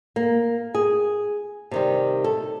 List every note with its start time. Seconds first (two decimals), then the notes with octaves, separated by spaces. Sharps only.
0.16 A#3
0.75 G#4
1.71 C3 D#3 G3
2.24 A4